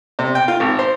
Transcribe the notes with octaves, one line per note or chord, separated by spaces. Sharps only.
C3
G5
F4
G#1
C5